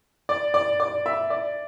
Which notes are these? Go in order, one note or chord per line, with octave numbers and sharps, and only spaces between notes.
D5
D5
D5
E5
D5